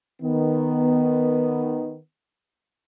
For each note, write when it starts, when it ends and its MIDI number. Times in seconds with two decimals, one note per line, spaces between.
0.22 1.97 51
0.22 1.97 59